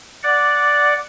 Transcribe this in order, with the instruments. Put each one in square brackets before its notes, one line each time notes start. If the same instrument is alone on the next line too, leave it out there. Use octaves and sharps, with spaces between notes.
[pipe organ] D5 F#5